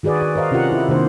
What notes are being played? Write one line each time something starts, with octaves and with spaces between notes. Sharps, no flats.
D#3 F#4 G#4 B4 D5
D5
A#4 C5 D#5 F5
C3 C#4 F4 G4 A#4 F#5
E4
C3 D#3 A#3 D4 C5